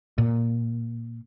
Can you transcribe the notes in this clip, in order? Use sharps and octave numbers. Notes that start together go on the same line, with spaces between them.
A#2